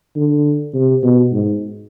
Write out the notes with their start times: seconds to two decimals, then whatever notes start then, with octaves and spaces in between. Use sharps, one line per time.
0.16 D3
0.74 C3
1.03 B2
1.32 G#2